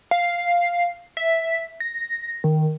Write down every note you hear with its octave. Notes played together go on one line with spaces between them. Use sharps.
F5
E5
A#6
D#3